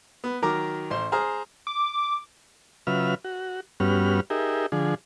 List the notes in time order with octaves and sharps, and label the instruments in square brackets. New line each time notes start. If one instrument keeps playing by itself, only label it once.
[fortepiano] B3
D#3 F#3 A#4 A#5 D6
A1 C5 C6
G#4 C5 A#5 F6
[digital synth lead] D6
[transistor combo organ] C#3 F#3 F4 B4 E5 F6
F#4
G2 G3 B3 C#4 F#4 F6
D#4 G4 G#4 A#4 E5
D3 F3 G#4